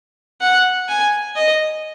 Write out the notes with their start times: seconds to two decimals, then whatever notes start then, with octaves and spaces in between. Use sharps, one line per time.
0.41 F#5
0.88 G#5
1.36 D#5